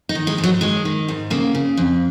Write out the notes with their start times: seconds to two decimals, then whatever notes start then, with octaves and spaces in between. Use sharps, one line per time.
0.09 D#4
0.15 D#3
0.27 G#3
0.38 G#2
0.44 F#3
0.61 D#3 G#3
0.85 D#3
1.08 G#2
1.30 C#3 A#3
1.55 C#3
1.77 F2